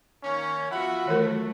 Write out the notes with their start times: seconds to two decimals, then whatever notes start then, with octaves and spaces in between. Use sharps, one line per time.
0.23 D#3 A#3 C#4
0.70 F3 B3 F4 F#4 E5 F#5 B5
1.06 D#3 E3 F#3 A3 A#4